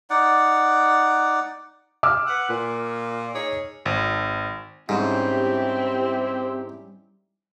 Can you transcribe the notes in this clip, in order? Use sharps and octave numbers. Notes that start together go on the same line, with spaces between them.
D#4 D5 F#5
D6 E6 F6
B4 F#5
A#2
D#4 G#4 C#5
G#1
G#2 G3 C4 C#4 E4 G4 C5